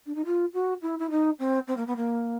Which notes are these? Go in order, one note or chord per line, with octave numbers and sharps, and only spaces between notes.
D4
D#4
F4
F#4
E4
E4
D#4
C4
C4
A#3
B3
A#3